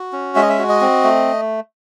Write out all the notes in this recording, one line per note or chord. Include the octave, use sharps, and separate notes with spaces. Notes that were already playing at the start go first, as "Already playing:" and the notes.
Already playing: F#4
C#4
G#3 E5
D#5
E5
F#4
D#5
C4
A3